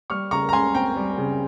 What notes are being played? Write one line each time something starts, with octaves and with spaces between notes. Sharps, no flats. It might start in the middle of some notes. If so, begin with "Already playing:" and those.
G3 C#6 F6
C#3 A#5 C#6
A#5
C#2 G#5 C6
C4 G5 A#5
G3
C#3